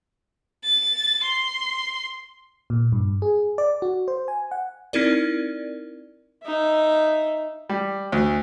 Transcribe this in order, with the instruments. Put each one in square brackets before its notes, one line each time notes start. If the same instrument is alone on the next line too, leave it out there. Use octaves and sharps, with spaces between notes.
[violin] A6
C6
[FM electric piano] A#2
G2
G#4
D5
F#4
C5
G#5
F#5
[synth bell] C4 D#4 E4 A#4 D5
[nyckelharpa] D#4 E5
[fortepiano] G3
D2